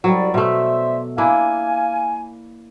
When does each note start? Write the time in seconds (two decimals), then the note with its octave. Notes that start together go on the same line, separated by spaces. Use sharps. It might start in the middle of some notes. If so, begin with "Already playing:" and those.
0.04 C2 F#3 G3 D5
0.34 B2 A3 C5 D5 E5
1.18 A#3 D4 E4 F5 G#5